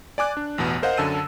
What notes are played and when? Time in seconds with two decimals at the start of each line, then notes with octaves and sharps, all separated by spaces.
0.18 D5 G#5 D6 F#6
0.37 D4
0.58 A1 E2 B2 B3
0.83 A#4 C5 D#5 F5 F#5
0.97 F#2 D3 A5 E6 D#7